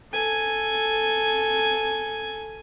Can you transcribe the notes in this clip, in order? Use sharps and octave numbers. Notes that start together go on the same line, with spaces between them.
A4 G#5